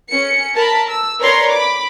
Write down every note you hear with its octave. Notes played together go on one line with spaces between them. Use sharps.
C#4 C#7
A#4 A5 B5
E6
A#4 B4 C#5 D5 A#5 C6
B5 D6